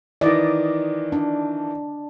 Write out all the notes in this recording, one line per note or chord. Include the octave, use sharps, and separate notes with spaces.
D#3 E3 D5 D#5
D4